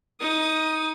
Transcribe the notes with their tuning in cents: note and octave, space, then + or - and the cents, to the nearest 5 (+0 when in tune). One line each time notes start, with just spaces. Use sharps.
D#4 +20 D#6 +0